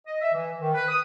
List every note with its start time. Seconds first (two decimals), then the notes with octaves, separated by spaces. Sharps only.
0.06 D#5
0.21 E5
0.33 E3
0.59 D#3
0.74 B4
0.89 D#6